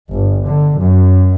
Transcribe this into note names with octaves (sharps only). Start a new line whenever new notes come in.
G1
D3
F#2